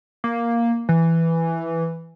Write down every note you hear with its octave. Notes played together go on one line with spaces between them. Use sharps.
A#3
E3